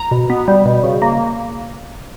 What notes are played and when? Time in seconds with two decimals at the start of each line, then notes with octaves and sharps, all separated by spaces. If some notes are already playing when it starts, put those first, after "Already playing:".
Already playing: A#5
0.11 B2
0.30 B3
0.48 G3
0.66 B2
0.83 C#3
1.02 A#3